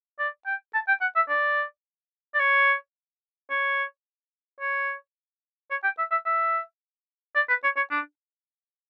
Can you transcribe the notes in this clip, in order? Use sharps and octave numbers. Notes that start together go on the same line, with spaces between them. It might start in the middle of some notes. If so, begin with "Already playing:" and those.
D5
G5
A5
G5
F#5
E5
D5
D5
C#5
C#5
C#5
C#5
G5
E5
E5
E5
D5
B4
C#5
C#5
D4